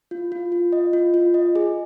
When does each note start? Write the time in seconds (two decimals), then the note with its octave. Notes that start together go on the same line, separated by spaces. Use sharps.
0.11 F4
0.32 F4
0.52 F4
0.73 D#5
0.93 F4
1.14 F4
1.34 D#5
1.55 G#4